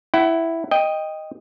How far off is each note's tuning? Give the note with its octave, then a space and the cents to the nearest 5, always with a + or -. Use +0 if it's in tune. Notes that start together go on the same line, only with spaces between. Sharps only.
E4 +0 F#5 +30
D#5 +0 G5 +10